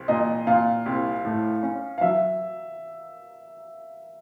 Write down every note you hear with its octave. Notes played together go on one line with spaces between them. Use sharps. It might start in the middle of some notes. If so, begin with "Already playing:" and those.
Already playing: C2
A#2 D#5
A#2 F5
C2
A2
C#4
F5
F#3 E5